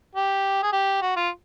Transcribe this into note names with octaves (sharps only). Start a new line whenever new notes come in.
G4
G#4
G4
F#4
F4